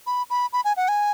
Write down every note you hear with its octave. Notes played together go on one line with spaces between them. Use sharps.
B5
B5
B5
G#5
F#5
G#5